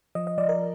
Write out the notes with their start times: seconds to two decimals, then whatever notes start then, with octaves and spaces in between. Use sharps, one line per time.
0.15 F3 D#5
0.27 D#5
0.38 F3 D5
0.49 A#4